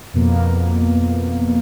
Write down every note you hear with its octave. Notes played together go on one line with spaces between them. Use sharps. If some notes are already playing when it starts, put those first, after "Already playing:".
F2 B2 A#3